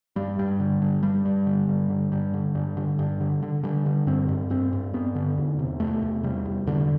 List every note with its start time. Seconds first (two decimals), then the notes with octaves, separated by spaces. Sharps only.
0.16 G2 G3
0.39 G2
0.60 D3
0.82 G2
1.03 G2 G3
1.25 G2
1.46 D3
1.69 G2
1.90 D3
2.12 G2
2.34 D3
2.55 G2
2.77 D3
2.99 G2
3.20 D3
3.43 D3
3.63 D3 G3
3.86 D3
4.07 G2 C4
4.29 G2
4.50 G2 C4
4.73 G2
4.94 G2 B3
5.15 D3
5.38 E2
5.59 C3
5.80 E2 A3
6.02 E2
6.23 C3 G3
6.45 E2
6.67 E2 D3